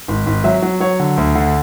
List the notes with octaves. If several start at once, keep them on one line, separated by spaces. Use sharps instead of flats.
G#1
G#1
F#3 E5
F#3
F#3 C#5
D3
D2
D3